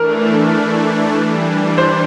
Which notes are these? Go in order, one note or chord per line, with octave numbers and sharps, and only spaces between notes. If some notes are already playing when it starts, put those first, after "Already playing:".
Already playing: E3 A3 D4 A#4
E3 G3 D4
C5